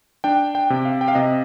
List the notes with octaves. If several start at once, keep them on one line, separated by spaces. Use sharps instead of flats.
D4 G5
G5
C3
F5
G5
F5
C3 D#5